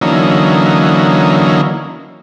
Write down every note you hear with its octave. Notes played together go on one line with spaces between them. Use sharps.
D3 E3 F#3 A#3 C#4 D#4